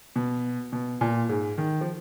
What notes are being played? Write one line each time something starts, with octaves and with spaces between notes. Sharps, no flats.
B2
B2
A#2
G#2
D#3
F3